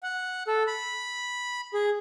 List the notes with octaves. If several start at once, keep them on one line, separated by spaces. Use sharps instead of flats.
F#5
A4
B5
G#4